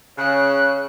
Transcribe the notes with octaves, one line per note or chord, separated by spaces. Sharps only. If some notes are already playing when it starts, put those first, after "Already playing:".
C#3 C#5 F#6